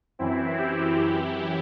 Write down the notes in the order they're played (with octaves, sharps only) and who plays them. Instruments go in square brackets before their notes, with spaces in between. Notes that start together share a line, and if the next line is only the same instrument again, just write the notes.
[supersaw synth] F#2 E3 C4 E4
E4 G4
F#2 E3